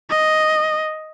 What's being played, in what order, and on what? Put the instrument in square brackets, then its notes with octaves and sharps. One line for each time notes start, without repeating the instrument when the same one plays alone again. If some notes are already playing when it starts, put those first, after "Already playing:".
[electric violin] D#5